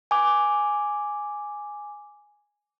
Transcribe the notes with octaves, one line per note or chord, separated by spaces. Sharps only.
G#5 D6